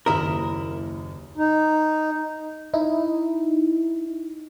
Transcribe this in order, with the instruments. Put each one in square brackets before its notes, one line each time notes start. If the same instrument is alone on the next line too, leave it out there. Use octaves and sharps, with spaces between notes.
[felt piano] F#1 D#2 D#6 [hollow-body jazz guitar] E4 A#4
[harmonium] D#4
[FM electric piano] D#4 E4